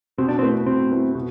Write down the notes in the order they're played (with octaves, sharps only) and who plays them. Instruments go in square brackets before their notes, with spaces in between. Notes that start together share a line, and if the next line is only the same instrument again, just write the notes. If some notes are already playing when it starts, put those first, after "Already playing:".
[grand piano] B2 [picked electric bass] C4
[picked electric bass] D4
C4
[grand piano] A3 E4 B4
[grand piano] B2 [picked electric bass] C4
[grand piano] A3 E4 B4
B2